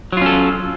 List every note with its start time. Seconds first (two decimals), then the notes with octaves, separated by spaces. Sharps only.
0.12 F#3
0.17 F4
0.21 C#4
0.26 A4